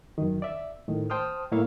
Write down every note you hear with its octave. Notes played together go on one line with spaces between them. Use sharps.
F#2 D#3
D5 E5
A2 D#3
C5 G5 A5 C6 D#6 F6
A2 A#3 E4 C#5 E5 F5